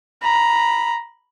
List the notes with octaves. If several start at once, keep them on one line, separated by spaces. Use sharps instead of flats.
A#5 B5